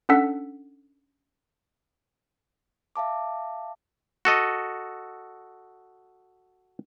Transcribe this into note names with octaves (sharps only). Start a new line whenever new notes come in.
C#4 D4 A4 F#5 E6 B6
E5 F5 A5 D6
F#4 A4 D#5